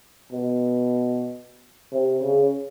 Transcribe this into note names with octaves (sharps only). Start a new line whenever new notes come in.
B2
C3
C#3